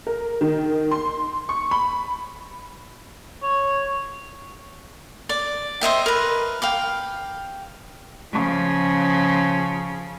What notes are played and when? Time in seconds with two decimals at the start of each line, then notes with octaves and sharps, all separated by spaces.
0.07 A#4
0.41 D#3
0.91 C6
1.49 C#6
1.71 B5
3.43 C#5
5.29 D5
5.81 C5 D#5 E5 G5
6.06 A#4 B4
6.62 F5 G5 D6
8.32 C#3 F3